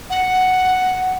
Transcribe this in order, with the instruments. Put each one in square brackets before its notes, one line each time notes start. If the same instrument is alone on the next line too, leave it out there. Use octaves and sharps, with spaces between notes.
[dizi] F#5